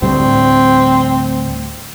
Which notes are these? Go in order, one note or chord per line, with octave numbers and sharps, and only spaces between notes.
D2 A2 G3 C4